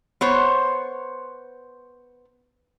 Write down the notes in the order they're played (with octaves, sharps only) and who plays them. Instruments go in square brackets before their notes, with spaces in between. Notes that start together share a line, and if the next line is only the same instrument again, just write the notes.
[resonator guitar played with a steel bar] B3 C5 C#5